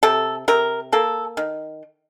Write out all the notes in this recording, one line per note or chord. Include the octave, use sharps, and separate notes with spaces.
C3 A4
C3 A#4
A#3 A4
D#3